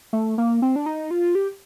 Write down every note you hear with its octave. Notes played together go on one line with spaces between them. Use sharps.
A3
A#3
C4
D4
D#4
F4
G4